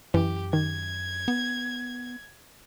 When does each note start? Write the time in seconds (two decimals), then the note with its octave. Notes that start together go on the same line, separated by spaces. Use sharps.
0.14 F#2 E3 G4
0.53 D#3 G#6
1.28 B3